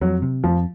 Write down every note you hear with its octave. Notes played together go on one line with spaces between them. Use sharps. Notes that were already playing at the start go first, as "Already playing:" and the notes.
F2 F#3
C3
F2 F3